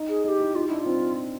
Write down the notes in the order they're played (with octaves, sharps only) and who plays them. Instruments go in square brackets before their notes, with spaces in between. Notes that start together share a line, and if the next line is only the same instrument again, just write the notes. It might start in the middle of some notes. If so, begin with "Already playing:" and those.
Already playing: [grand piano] D#4
[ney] G#4
[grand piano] D#4 [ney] G#4
[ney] G4
[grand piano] E4
[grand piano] D#4 [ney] F4
[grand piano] D4 [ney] E4
[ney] F4
[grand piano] C4